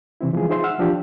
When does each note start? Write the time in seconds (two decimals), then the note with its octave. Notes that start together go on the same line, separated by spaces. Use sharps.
0.21 C3 E3 C4 E4
0.33 E3 F3 G#3 G#4
0.49 D#4 F4 G#4 C5 E5 C6
0.64 F#5 E6 F6
0.78 E3 F3 D4 F4 G4